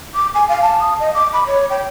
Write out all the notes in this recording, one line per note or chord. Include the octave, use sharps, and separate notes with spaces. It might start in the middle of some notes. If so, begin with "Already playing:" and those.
D6
G#5
F5
A5
D#6
D#5
D6
B5
C#5
G5